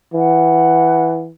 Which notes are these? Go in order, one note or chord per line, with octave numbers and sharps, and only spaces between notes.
E3 F#5